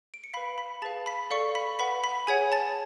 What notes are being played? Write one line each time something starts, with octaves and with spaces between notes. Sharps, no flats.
D7
C#7
B4 F5 B5 B6
B5 B6
G#4 B4 F5 A5 A6
B5 B6
A4 D5 F5 C#6 C#7
B5 B6
B4 F#5 B5 B6
B5 B6
G#4 C#5 F#5 G#5 G#6
A5 A6